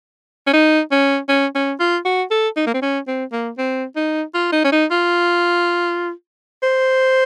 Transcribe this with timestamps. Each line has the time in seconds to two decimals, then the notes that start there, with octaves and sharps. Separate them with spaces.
0.47 C#4
0.53 D#4
0.91 C#4
1.29 C#4
1.55 C#4
1.80 F4
2.05 F#4
2.31 A4
2.57 D#4
2.66 A#3
2.74 C4
2.82 C#4
3.07 C4
3.32 A#3
3.58 C4
3.96 D#4
4.34 F4
4.52 D#4
4.64 C#4
4.72 D#4
4.91 F4
6.63 C5